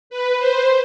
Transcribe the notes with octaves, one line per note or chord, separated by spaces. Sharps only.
B4
C5